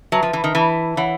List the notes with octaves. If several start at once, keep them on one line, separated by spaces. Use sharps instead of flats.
F#3 B4 E5 A5
F3
E3
D#3
E3 B4 E5 A5
E3 C#5 F#5 B5